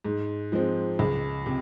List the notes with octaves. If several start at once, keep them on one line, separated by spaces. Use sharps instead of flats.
G#2
F3 G#3 C4
C#2
C3